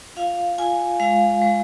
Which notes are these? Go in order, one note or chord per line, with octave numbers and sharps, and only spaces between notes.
F4 F5
F4 G#5
G#3 F5
G#3